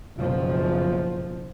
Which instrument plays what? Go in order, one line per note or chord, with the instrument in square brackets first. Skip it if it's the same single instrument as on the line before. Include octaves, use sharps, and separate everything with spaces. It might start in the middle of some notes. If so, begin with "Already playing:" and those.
[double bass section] F#1 B2 F3